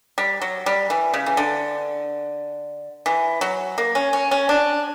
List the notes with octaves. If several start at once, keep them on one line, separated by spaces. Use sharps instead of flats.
G3
F#3
G3
E3
C#3
E3
D3
E3
F#3
A#3
C#4
C#4
C#4
D4